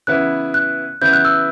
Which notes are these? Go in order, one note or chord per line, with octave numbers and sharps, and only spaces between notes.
C#3 E3 B3 E4 F#6
F#6
C#3 E3 B3 E4 G6
F#6
E6